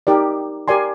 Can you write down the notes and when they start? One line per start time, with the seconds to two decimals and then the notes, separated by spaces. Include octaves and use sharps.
0.07 D#4 G4 A#4 D5
0.68 G4 A#4 D5 G#5 C6